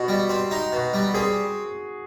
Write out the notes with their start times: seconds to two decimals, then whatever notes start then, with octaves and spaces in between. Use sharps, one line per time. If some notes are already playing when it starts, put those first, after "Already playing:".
Already playing: B2 F#4
0.08 G3
0.29 C4
0.51 D#4
0.72 B2
0.94 G3
1.14 C4 G#4